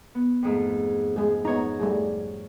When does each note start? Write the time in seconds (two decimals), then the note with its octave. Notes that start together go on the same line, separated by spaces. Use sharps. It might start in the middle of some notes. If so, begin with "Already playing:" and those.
0.15 B3
0.42 F2 G#2 A3
1.16 G#3 G#4
1.45 B3 D#4 C#5 A#5
1.80 G3 A3 G#4